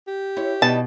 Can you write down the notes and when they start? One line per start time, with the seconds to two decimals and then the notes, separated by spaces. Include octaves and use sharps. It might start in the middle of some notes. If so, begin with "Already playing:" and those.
0.07 G4
0.37 E4 C#5
0.62 B2 D4 D#4 B4 A5